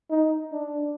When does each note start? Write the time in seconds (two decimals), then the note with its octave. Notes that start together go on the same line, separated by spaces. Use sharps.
0.10 D#4
0.52 D4